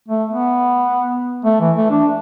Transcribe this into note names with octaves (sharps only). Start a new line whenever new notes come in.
A3
B3
A3
E3
A3
D4